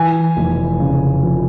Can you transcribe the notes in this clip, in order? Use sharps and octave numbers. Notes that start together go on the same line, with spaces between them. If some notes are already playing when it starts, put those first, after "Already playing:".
Already playing: E3 G#5
F1
C#3
F2